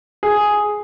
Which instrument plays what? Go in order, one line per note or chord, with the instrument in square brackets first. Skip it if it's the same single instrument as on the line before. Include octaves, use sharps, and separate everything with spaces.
[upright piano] G#4